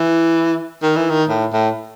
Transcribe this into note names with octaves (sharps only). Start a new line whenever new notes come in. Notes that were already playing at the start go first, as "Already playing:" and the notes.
Already playing: E3
D#3
E3
D#3
A2
A2